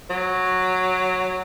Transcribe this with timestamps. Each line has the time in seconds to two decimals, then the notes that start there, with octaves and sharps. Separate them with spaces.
0.10 F#3